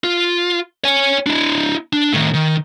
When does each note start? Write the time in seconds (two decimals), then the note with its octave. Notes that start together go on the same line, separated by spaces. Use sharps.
0.04 F4
0.84 C#5 G#5
1.26 D4 E4
1.93 D4
2.13 A2 D#3
2.34 D#3